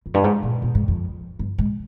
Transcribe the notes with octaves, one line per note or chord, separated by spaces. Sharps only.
F2
G2
G#2
A#2
A#2
G#2
F2
G2
G#2